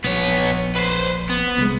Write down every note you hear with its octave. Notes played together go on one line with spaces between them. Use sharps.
A#1 B3 C#5
B4 C5
B3
C2 G#3